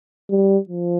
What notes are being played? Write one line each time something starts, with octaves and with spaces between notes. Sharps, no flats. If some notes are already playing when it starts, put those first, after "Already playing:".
G3
F3